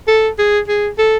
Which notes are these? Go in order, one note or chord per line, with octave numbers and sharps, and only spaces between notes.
A4
G#4
G#4
A4